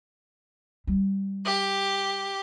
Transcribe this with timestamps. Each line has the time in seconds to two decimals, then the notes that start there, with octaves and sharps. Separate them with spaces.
0.87 G3
1.45 G4